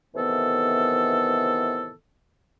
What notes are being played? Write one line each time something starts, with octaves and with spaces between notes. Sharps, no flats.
A2 C3 D#3 E3 B3 A4